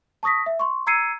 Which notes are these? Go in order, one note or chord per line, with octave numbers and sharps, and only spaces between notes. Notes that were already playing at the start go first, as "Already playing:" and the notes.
A5 C#6 D#6 A#6 B6
E5
C6 C#6
A#5 E6 G#6 C7 C#7 D#7